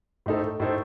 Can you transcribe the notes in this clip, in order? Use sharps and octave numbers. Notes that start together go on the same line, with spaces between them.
A2 A3 D#4 A4 C5
A2 A3 D#4 A4 C5